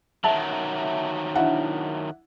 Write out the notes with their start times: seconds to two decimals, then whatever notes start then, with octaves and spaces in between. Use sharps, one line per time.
0.24 D#3 F#3 E5 A5
1.35 D4 E4 F#5